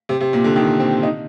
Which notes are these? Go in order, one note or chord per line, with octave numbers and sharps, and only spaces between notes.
C3
C3
A#2
D3
D#3
C4
D#4